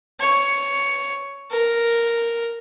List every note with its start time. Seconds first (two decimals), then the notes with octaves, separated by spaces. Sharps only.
0.20 C#5
1.51 A#4